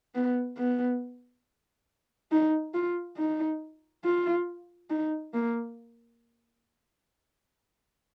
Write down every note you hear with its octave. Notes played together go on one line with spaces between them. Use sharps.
B3
B3
D#4
F4
D#4
F4
D#4
A#3